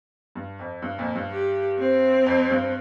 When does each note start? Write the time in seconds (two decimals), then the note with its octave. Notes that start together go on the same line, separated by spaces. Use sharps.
0.35 G2
0.59 F2
0.82 G2
0.99 F2 A#2
1.15 G2
1.31 G4
1.79 C4
2.26 F2
2.50 G2